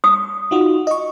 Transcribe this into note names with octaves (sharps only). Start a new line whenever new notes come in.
D#6
D#4 F4 F#4
D#5 C#6